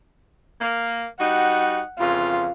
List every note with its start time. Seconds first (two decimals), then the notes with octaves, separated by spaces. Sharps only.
0.62 A#3
1.20 G3 D#4 F#4 F#5
1.99 F2 C#3 E3 F4